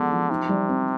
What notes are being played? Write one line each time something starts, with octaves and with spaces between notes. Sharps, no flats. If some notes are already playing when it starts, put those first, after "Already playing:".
Already playing: D3 F3 G#3 B3
F3
C3 D#4
G3
C4